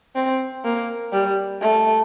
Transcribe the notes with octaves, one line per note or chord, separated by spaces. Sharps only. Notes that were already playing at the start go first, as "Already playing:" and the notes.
C4
A#3
G3
A3